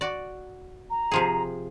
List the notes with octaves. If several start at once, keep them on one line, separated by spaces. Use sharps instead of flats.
F#4 D5
A#5
C3 F3 G#4